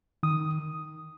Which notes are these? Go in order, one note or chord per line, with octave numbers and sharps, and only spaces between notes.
D#3 D#6